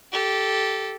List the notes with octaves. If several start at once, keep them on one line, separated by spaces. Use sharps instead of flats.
G4 A4